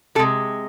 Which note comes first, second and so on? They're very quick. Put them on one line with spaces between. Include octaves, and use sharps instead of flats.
C3 A4 G#3